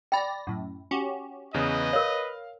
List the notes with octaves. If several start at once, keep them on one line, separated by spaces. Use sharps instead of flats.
D5 G5 B5 A#6
F#2 A2
C#4 F#4 G4
E2 C#3 B4 D#5 D#6
A#4 C#5 F5